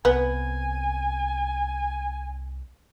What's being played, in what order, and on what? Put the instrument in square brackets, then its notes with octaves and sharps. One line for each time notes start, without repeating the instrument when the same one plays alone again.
[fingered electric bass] C2 [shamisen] B3 [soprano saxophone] G#5